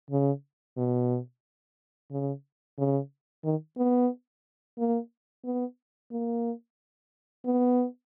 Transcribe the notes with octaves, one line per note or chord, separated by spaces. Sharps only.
C#3
B2
C#3
C#3
D#3
B3
A#3
B3
A#3
B3